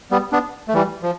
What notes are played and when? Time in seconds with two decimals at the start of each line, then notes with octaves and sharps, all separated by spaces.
0.11 G3 B3
0.32 B3 D4
0.68 A3
0.74 E3 G3
1.03 F3